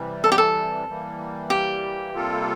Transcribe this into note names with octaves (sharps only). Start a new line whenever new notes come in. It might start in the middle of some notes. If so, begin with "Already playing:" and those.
Already playing: C3 E3 G3
A4
G4
A4
E3 G3 A#3
G4
C3 G3 A#3 F4 A4